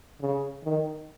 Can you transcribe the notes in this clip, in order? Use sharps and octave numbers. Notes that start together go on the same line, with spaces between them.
C#3
D#3